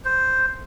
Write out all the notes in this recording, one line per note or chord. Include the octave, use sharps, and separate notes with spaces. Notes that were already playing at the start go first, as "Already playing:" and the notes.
C5